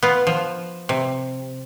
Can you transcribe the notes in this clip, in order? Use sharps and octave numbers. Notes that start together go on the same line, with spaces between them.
B3 F4
F3
C3